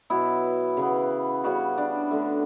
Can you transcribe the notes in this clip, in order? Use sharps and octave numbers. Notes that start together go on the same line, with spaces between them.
B2 F#3 B3 E4
C#3 E3 B3
C#3 G3 B3 F#4
D4
D3 A3